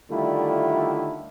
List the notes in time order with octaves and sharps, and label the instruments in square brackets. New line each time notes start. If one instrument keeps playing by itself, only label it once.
[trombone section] D3 D#3 G3 A3 E4 F4